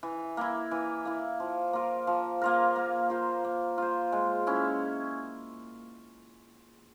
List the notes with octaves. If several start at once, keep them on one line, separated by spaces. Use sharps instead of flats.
E3
A#3 E4
E3
A#3 E4
F3
A#3 F4 A#4
F3
A#3 F4 A#4
A#3
F4 C5
A#3
F4 C5
G#3
C#4 E4